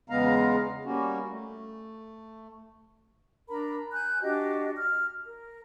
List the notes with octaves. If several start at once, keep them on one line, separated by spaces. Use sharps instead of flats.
E2 C#3 G#3 B3 F5 A#5
G3 A#3 C#4 F#4
A3
D4 A#4 A#5 B5
G#5 F#6 G6
D4 F#4 G4 D#5
F6
A#4